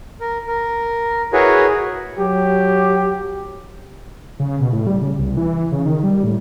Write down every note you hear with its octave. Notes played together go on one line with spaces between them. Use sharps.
A#4
A#4
E4 F#4 G#4 A#4 B4 C#5
F#3 G4
C#3
B2
A2
G3
C#3
C2
E3
C#3
D#3
G3
A2